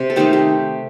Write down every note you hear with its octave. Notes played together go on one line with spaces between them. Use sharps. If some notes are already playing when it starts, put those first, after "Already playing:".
Already playing: C3
A4
D#3 A3 C4 D#4 G4
G4